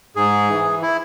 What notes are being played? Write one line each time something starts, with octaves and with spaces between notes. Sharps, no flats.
G#2 G#4
E3
E4